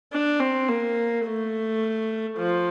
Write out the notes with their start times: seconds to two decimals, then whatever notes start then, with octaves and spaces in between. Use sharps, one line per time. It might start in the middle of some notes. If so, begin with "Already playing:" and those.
0.12 D4
0.40 C4
0.68 A#3
1.25 A3
2.38 F3